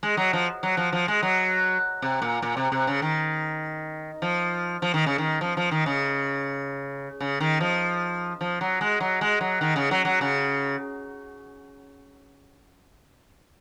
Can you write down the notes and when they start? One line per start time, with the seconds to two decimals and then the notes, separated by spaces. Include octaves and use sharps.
0.03 G#3
0.17 F#3
0.33 F3
0.63 F#3
0.77 F3
0.93 F3
1.08 G#3
1.23 F#3
2.02 C3
2.22 A#2
2.42 A#2
2.57 C3
2.72 C3
2.87 C#3
3.02 D#3
4.22 F3
4.82 F3
4.94 D#3
5.06 C#3
5.18 D#3
5.41 F3
5.57 F3
5.71 D#3
5.86 C#3
7.20 C#3
7.40 D#3
7.60 F3
8.41 F3
8.61 F#3
8.81 G#3
9.01 F#3
9.21 G#3
9.41 F#3
9.61 D#3
9.76 C#3
9.91 F#3
10.05 F#3
10.21 C#3